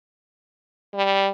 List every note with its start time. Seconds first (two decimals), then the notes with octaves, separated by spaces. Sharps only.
0.95 G3